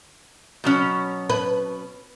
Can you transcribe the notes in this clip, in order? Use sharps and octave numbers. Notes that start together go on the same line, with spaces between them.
B2 F#3 C#4
B4